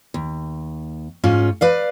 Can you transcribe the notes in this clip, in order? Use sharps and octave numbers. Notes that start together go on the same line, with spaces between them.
D#2
G#2 C#4 F4
B4 D5 F5